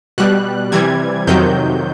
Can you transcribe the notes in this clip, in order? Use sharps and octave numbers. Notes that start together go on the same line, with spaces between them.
B2 G3 F#6
C3 E3 G3 G#6
F2 C3 D#3 F#3 G6